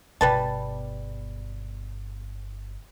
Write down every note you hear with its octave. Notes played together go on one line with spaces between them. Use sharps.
G1 B2 G3 B4 A5